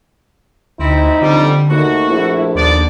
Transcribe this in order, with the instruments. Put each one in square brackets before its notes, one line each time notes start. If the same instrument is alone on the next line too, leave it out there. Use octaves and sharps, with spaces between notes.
[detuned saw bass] D2 [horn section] C4 E4 [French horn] D#4
[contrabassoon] F2 [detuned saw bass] D3 [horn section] F3 G3
[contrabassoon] D#2 [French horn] A3 [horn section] F#4
[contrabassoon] A#1 [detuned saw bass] E4
[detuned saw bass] D#2 [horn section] D3 B3 D5 [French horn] D4